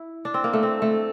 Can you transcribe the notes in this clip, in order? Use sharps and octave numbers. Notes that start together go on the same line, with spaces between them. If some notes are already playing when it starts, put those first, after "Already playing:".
Already playing: E4
D4
C4
A#3
A3
C4
A3